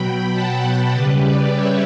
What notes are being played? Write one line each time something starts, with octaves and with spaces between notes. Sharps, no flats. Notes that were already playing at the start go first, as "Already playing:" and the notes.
Already playing: B2 F#3 G5 B5
F#5 A5
C#3 G3 G4 B4
B4 D5
C#5 E5